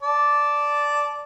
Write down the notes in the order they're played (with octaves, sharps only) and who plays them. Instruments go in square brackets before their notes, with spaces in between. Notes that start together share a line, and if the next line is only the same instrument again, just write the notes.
[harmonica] D5 A5